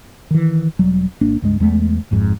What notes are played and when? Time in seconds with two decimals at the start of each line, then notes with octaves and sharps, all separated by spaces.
0.31 D#3 E3
0.79 E1 F#3 G3
1.21 G#1 A#3 D4
1.42 C#2 G2 G#3
1.60 E2 G#3 A3
2.11 G#1 F2 G#2